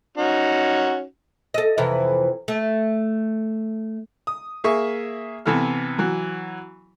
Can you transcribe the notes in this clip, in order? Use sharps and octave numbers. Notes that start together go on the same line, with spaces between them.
C#4 D#4 F#4
A4 D#5
F2 C3 E3
A3
D#6
A#3 G#4 E5 C#6
C3 E3 B3 A4 F6
E3 F#3